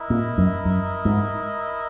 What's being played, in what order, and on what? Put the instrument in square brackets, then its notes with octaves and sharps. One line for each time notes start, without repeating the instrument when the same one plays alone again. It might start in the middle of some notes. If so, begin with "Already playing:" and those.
Already playing: [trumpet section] E4 A#4 D#5
[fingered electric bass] A#2
F#2
F#2
G#2